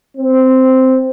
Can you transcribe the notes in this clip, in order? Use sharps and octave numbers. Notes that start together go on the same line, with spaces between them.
C4